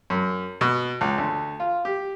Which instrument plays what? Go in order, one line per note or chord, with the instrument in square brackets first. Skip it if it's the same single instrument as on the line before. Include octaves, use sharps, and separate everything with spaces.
[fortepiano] F#2
B2
C#2
D2
F4
G4